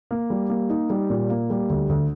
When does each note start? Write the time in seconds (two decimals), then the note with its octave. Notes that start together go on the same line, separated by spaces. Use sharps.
0.11 A#3
0.30 G3
0.50 A#3
0.69 D#4
0.90 G3
1.10 A#2
1.30 A#3
1.50 G3
1.70 D2
1.89 D2